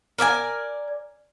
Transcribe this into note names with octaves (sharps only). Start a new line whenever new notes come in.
A#4 D5 E5 G#5